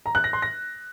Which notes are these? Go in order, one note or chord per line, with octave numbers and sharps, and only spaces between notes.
A#5
F#6
A#6
C6
A#6